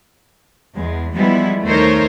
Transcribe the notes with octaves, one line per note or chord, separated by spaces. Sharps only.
E2 G#3
E3 F3 G3 G#3 B3 E4
D#2 A3 D#4 A#4 C5 C#5